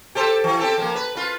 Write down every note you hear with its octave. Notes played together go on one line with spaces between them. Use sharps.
G4 A4 C5
E3
C4 G4 A4
F3 A#3
B4
F4 B4